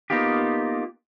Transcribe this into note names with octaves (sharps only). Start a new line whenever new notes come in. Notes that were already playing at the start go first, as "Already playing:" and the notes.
A#3 B3 D#4 F4 G4